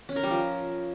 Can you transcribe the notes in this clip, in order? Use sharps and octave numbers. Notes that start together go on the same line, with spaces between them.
C#4
A#4
G3
F3